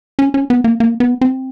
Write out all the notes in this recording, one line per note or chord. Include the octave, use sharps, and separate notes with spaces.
C#4
C#4
B3
A#3
A#3
B3
C4